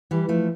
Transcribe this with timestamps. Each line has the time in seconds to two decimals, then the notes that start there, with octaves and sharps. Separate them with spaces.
0.11 E3 G3
0.29 F3 A3